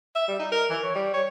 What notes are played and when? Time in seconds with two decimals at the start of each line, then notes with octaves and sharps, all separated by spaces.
0.15 E5
0.28 G3
0.40 D#4
0.52 A#4
0.70 E3
0.83 C#5
0.95 G3
1.14 C#5